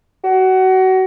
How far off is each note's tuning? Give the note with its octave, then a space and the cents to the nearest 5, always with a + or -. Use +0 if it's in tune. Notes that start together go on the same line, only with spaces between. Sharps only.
F#4 +25